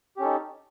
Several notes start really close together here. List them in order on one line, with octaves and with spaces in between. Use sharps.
G4 C#4 A4 D#4